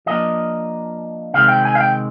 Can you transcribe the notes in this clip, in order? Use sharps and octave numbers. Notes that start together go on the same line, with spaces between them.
F3 A#3 D4 D#5
C3 D#3 G#3 C4 F5
G5
G#5
F5
G5